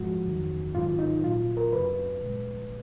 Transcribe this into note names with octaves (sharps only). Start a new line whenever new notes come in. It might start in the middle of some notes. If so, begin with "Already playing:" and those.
Already playing: G#2 F3 G#3 F#4
F2 D#3 F#3
G#2 D#3 F#3 F4
D#4
A#2 F#3 F4
A#4
F#2 C#3 F#3 B4
A#2 G#3